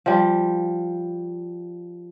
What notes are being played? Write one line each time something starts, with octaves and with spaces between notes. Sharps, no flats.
F3 G3